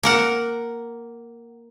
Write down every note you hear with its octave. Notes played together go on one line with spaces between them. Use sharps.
A#3 A#4 F#5